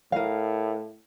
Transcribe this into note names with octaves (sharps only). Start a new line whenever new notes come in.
A2 A#4 F5